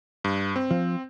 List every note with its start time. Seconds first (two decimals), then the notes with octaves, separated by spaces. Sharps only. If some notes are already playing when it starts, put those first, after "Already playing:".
0.24 G2
0.56 C4
0.71 F3